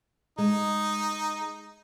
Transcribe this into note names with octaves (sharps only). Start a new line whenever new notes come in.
G#3 D#4